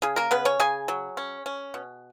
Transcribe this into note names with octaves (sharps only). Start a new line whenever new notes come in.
C#3 G#4
A#3 A#4
C#3 B3 B4
C#4 C#5
C#3 G#4 G#5
F#3
C#4
C#4
B2